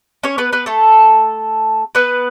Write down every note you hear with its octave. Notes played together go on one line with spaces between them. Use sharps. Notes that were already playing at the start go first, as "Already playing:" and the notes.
C#4 C#5
B3 B4
B3 B4
A3 A4
B3 B4